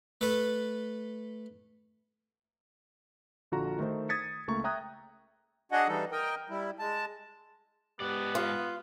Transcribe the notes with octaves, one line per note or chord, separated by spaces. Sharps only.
A3 A4 B4
A#1 D3 F4 F#4 A#5
D#3 A3 D#4 C5
D#6 G#6 A6 B6 C#7
C#2 A3 A#3 A#5 C#6
E5 G5 A#5 D#6 F#6 G#6
D4 F#4 G#4 D#5 F#5
E3 G3 D#4 A4
A#4 D#5 G5
G3 E4
G#3 A5
G#2 B3 G4 D5
F4